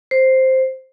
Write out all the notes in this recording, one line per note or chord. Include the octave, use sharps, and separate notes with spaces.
C5